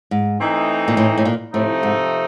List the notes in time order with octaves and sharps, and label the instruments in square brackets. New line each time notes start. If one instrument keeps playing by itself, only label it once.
[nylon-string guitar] G#2
[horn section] E3 A3 C4 D#4
[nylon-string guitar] A#2
A2
A2
A#2
[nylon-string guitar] A2 [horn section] C3 F3 A3 C4 D#4
[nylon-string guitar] G#2